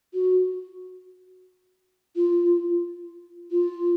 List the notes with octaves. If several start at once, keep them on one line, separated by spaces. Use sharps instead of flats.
F#4
F4
F4